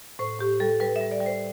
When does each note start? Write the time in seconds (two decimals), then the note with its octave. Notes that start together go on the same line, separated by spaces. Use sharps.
0.19 A2 C5
0.39 A2 G4
0.60 G3 A4
0.80 G3 B4
0.96 E5
1.01 G3
1.11 D5
1.20 G3
1.26 C5